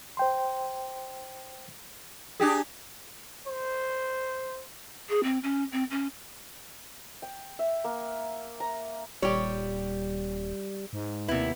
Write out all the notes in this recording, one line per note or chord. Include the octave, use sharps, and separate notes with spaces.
C5 G5 C6
D4 G4 G#4
C5
G#4
C4
C#4
C4
C#4
G5
E5
A#3
A#5
D#1 G3 G4 C#5
G#2
D#2 C3 B3 E4